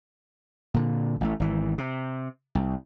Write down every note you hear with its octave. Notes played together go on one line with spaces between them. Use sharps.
A#2 D3
A1 A3
G#1 E3
C3
C2